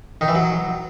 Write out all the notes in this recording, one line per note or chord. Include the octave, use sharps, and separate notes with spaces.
D#3
E3
F#3